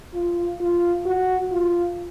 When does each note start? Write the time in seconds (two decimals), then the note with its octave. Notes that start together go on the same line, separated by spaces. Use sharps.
0.14 F4
0.60 F4
1.06 F#4
1.52 F4